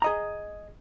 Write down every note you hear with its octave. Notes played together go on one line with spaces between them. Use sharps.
G#4 D#5 A#5